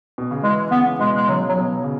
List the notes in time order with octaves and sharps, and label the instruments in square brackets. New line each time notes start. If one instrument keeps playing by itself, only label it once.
[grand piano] B2
C#3
[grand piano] E3 [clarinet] G#3
[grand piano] C#3 [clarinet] B3
[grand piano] B2 [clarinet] G#3
[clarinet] G#3
[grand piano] C#3 [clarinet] F#3
[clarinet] F#3
[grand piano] B2
C#3